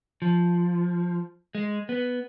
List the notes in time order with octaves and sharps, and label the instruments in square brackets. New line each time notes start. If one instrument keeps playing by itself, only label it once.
[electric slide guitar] F3
G#3
B3